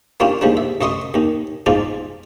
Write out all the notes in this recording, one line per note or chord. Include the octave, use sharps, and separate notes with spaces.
A#3 C#4 D4 E4 F4 G4
D#2 F3 G3 G#3 D4
E5
F#2 A3 D#5 C6 C#6 D#6
D#2 D#3
E2 G#2 G#3 F4 D5